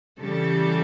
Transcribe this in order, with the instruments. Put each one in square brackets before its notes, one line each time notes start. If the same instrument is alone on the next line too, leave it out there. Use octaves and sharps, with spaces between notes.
[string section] C#3 E3 G3 A4